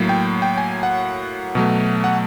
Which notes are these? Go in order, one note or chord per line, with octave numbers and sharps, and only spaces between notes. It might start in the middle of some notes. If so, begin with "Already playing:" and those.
Already playing: A2 F#3 A#3
G5
G5
G#5
F#5
B2 F#3 A3
F#5